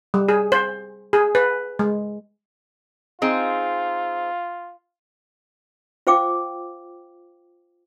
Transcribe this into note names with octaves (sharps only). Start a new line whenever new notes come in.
G3
G#4
C5
G#4
B4
G#3
C4 D#4 F4 G#4
F4 C5 F5 G5 D6